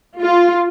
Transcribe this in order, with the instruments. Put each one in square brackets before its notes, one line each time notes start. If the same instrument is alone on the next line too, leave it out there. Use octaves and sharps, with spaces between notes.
[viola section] F4